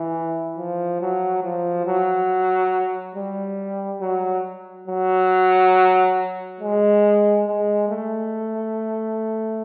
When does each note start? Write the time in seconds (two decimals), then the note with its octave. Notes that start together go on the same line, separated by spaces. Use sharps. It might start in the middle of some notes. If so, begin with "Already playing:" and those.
Already playing: E3
0.57 F3
1.01 F#3
1.43 F3
1.86 F#3
3.15 G3
4.01 F#3
4.87 F#3
6.60 G#3
7.46 G#3
7.89 A3